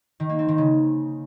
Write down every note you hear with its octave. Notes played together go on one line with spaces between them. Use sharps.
D#3
A#3
C4
D#3
C#3